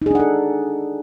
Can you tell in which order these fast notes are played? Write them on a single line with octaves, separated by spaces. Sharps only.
D#4 G#4 D4 F#5 A4